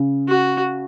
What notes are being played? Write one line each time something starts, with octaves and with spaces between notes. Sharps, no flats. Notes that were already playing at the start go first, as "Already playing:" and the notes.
Already playing: C#3
F#4